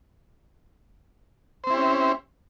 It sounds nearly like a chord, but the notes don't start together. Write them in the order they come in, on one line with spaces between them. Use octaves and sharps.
C5 C4 E4 G4 C#4